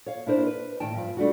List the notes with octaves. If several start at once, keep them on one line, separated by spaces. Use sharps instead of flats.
C#5 F5
D4 E4 A#4 C5
B4
A2 D#3 G5 A5
G2 F3
G3 A3 D4 F#4